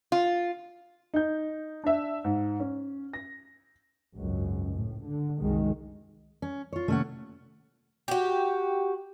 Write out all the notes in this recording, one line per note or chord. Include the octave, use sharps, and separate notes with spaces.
F4
D#4 G6
D4 E5
G#2
C#4
A#6
G#1 C#2 F#2
A2
D3
C2 F#2 D#3 G#3
C#4
F4 C#5
C3 D#3 A3 A#3 C#4 F#5
F#4 G4